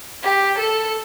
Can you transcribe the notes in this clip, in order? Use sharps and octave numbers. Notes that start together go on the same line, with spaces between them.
G4
A4